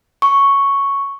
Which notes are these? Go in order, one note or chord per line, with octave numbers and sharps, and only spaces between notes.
C#6